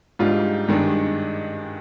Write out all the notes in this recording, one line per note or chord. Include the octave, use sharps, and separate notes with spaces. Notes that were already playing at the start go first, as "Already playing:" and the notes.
G#2 G3 D4 F4
G2 D#3 G#3 D4